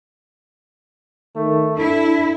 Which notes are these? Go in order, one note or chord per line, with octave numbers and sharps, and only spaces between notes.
D#3 A3
D4 E4 A4